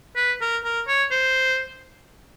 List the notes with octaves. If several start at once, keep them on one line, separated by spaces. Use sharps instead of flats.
B4
A#4
A#4
C#5
C5